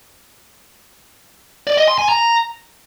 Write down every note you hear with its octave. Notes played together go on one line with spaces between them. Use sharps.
D5
D#5
C6
G#5
A#5